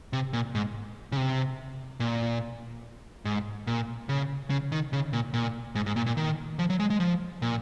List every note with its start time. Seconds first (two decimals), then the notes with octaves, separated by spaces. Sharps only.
0.13 C3
0.33 A#2
0.55 G#2
1.12 C#3
1.17 C3
2.00 A#2
3.25 G#2
3.67 A#2
4.09 C#3
4.50 C#3
4.72 D#3
4.93 C#3
5.13 A#2
5.34 A#2
5.75 G#2
5.86 G#2
5.96 A#2
6.06 A#2
6.17 D#3
6.59 F3
6.70 F#3
6.80 G#3
6.90 G#3
7.00 F3
7.42 A#2